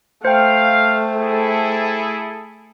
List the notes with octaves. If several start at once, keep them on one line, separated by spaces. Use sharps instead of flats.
A3 C5 F5 G5
E4 G#4 A4